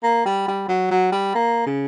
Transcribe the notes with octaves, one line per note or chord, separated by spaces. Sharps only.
A#3
G3
G3
F#3
F#3
G3
A#3
C#3